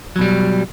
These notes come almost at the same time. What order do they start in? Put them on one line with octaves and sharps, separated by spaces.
F#3 B2 G3